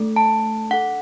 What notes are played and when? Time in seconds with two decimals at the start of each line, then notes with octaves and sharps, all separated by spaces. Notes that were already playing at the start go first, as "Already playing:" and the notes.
Already playing: A3 D4 A4
0.16 A5
0.70 D4 A4 F#5